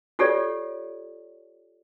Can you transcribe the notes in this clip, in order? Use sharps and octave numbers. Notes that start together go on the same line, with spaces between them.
F4 G4 A4 C#5 D5